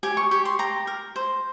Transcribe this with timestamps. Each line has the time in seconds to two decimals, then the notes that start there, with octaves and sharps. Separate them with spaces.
0.03 G4 G#5
0.17 C#6
0.31 G4 C#6
0.45 C6
0.59 G4 A#5
0.87 A#4
1.16 C5